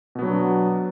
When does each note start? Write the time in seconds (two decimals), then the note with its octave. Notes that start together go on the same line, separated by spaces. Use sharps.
0.15 B2
0.19 B3
0.22 F#3
0.25 D4